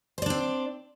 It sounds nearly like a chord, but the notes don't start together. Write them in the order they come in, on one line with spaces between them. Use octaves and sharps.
C5 D5 D4 C4